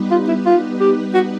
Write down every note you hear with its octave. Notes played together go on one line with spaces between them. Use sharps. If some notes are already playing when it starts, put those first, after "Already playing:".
Already playing: G3 B3 D#4 G4 B4
F4
E4
F4
G4
F#4